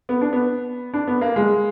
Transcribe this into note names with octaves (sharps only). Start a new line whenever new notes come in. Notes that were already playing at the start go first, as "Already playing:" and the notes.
B3
D4
B3
D4
B3
A#3
G#3